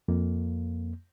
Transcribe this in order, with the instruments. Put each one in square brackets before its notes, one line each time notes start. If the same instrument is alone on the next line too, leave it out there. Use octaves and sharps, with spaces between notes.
[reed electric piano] F2 A#3